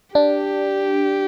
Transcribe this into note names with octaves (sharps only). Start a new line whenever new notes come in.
D4 G4